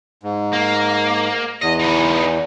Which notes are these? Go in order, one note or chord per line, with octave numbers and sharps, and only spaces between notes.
G#2
A#3
E2 D#5
E3 D#4